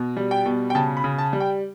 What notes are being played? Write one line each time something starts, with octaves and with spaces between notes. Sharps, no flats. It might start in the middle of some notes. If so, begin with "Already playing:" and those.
Already playing: B2
G3
G5
B2
G5
C#3 A5
B5
C#3
A5
G3
G5